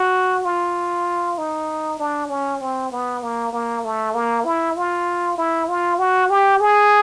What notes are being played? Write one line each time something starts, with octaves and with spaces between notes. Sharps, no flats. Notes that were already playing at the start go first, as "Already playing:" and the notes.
Already playing: F#4
F4
D#4
D4
C#4
C4
B3
A#3
A#3
A3
A#3
E4
F4
E4
F4
F#4
G4
G#4